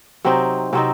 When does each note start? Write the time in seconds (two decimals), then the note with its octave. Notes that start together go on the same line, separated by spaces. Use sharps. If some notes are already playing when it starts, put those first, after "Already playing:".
0.25 C3 F#3 C4 D#4
0.73 C3 F#3 C4 D#4